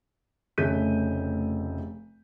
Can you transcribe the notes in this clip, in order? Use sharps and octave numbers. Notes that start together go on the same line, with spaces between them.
F1 C#3 A3 G6 B6 D#7